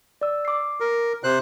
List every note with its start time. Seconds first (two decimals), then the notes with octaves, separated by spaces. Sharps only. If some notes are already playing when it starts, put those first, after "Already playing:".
0.21 D5 E6
0.45 D6 C7
0.80 A#4
1.24 C3 C5 F#6